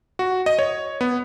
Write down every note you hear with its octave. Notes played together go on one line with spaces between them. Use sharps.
F#4
D#5
C#5
B3